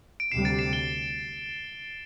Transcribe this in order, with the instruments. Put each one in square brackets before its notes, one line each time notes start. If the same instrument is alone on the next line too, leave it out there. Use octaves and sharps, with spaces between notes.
[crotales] D7
[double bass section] D2 C3 G3 [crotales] C7 E7
[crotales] A6 D7
C7 E7
D7 G7